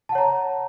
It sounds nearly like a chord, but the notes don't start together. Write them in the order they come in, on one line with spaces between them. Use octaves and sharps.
A5 F#5 C#5 A#5